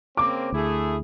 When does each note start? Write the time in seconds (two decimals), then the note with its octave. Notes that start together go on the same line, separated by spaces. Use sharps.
0.17 C#3 A#3 C4 D6
0.52 D2 A3 E4 G#4